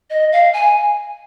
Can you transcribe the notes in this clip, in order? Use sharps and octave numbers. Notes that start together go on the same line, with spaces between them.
D#5
F5
G#5